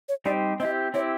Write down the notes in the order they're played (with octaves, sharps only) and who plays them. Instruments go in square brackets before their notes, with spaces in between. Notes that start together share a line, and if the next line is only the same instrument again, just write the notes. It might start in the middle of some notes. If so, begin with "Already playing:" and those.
[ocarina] C#5
[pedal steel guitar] G3 C4 D#4 G4 C5 [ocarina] D5
[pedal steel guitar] C4 E4 G4 [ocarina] D#5
[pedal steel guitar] C4 E4 G4 [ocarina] C#5